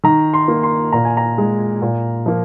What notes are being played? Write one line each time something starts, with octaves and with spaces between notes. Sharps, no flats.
D#3 A#5
C6
A#3
C6
A#2 A#5
G#5
A#5
G#3
A#2
F3 A#3